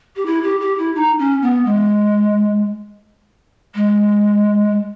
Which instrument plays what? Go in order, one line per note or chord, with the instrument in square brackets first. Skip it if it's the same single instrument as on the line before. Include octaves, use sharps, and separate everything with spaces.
[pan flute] G4
E4
G4
G4
E4
D#4
C#4
B3
G#3
G#3